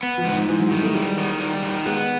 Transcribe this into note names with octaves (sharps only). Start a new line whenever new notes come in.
B3
F3
G#2
D#3
G#2 E3
F#3
D#3 G3
A3
G3 G#3
D#3
G3
D#3
G#3 B3